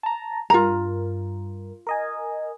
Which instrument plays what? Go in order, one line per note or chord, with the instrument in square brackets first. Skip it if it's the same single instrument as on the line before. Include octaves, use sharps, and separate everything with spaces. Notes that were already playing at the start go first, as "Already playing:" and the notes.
[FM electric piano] A5 A#5
[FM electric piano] G2 A#4 [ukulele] F4 A#5
[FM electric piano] A#4 D#5 G#5